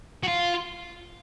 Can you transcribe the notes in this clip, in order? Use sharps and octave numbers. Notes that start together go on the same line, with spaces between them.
F#4
F4